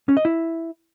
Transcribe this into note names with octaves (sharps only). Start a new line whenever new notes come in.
C#4
D#5
E4